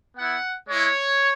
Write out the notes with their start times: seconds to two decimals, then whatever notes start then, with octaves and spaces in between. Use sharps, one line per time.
0.16 B3 E4 F#5
0.68 G#3 E4 C#5